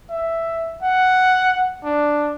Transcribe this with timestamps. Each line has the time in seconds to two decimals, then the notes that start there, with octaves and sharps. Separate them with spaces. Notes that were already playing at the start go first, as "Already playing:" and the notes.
0.10 E5
0.83 F#5
1.84 D4